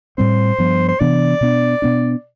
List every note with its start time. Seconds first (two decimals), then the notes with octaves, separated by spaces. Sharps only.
0.18 A2 G3 C4 C5
0.58 G2 F3 B3
0.88 C5
0.99 C3 E3 B3 D4 D5
1.41 B2 B3 D4
1.82 B2 B3 D4